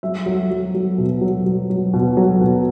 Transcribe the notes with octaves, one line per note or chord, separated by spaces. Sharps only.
F#3 E5
F#3
F#3
F#3
B2
F#3
F#3
F#3
B2
F#3
B2